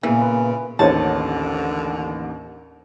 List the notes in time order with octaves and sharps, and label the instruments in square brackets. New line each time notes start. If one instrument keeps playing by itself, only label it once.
[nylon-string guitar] A#2 B3 [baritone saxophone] C#3 [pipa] E3
[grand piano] B4
[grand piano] A1 D#2 [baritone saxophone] D3 [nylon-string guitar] C5 C#5 D#5 [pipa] A5